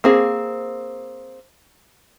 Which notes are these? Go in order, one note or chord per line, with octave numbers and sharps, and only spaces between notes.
A#3 C4 G#4